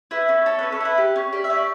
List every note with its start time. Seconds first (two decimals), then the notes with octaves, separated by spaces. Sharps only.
0.11 E4 B4
0.28 C#4 A4
0.46 A4 C#5
0.59 C#4 B4
0.72 A4
0.80 E4 B4
0.98 G4
1.16 C#4
1.33 G4 D5
1.44 E5
1.50 C#4
1.56 D5